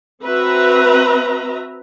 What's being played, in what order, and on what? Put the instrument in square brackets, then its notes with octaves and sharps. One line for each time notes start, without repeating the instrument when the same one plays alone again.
[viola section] C4 F#4 B4 E5 A#5